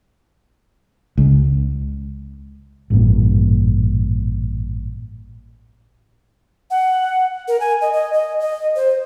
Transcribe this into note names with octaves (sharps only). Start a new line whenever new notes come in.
C#2
A1 G2 A#2
F#5
A#4
G#5
D#5
D#5
D#5
D#5
C5